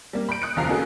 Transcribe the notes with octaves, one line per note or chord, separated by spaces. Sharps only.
G3 A#3
B5 G6 D7
D#6 F#6 C#7 D7
F#1 D#2 F3 F5 A#5 C7
A#3 C#4 D#4 F#4 G#4 A4